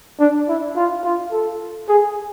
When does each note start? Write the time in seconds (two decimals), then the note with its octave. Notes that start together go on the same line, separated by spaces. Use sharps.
0.20 D4
0.49 E4
0.76 F4
1.05 F4
1.32 A4
1.88 G#4